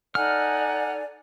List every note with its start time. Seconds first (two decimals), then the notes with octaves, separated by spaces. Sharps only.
0.15 D#4 A4 D5 F#5 G#5 F6